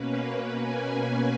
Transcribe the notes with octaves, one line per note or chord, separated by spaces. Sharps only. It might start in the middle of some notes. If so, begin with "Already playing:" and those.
Already playing: B2 A#3 C#4 B4
G#5